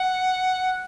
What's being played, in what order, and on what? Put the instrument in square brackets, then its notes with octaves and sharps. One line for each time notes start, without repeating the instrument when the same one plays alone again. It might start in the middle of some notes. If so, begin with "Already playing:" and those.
Already playing: [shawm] F#5